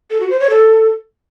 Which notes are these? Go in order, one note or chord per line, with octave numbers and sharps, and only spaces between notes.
A4
F#4
C5
C#5
A4